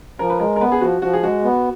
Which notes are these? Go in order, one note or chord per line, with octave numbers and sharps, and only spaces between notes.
F3 A#4
B4
G#3 A#4
A#4
B3 B4
G#4
F3 F#4
F3 F#4
G#4
G#3 F#4
B3